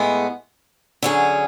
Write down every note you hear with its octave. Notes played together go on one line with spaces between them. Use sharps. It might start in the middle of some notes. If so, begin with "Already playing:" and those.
Already playing: A2 G#3 B3
D3 F#3 C#4 G#4